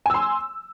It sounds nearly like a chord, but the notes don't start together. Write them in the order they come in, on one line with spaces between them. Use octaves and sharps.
G#5 E6 C6